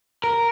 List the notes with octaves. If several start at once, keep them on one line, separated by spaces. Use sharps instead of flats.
A#4